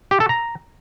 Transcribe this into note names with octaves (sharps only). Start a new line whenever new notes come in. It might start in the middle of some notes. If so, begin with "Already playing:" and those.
G4
A4
A#5